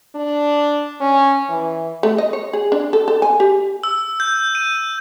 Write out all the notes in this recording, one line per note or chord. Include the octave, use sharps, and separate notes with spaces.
D4
C#4
E3
A3
D#5
C#5
G#4
D4
A4
A4
G#5
G4
E6
G6
D#7